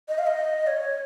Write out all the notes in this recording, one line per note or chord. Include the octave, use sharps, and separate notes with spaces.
D#5
F5
D#5
C#5